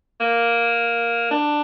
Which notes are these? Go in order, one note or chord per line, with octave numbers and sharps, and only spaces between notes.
A#3
D4